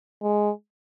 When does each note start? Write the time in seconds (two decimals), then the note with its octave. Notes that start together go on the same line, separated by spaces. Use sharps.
0.23 G#3